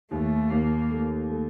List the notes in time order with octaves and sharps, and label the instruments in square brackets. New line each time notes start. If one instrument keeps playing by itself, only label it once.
[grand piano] D#2 [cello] A3
[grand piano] D#2 [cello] A#3
[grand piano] A3
A3